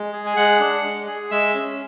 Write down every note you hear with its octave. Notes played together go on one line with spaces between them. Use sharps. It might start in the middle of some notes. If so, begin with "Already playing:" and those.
Already playing: G#3
G#4
G#5
G#3 F#5
D4
G#3
G#4
G#3 E5
C#4